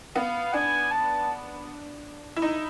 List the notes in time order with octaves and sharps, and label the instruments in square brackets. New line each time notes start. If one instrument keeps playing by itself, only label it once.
[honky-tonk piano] B3 [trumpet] F5
[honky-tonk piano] D4 [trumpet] G#5
[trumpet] A5
[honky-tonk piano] E4
D#4